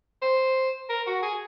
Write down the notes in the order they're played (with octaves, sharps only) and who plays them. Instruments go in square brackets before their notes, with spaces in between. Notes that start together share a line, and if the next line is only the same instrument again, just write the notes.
[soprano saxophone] C5
A#4
F#4
G#4